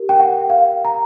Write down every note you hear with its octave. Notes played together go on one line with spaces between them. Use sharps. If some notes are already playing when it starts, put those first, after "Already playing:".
Already playing: G4 A#4
G5
F#5
F5
A#5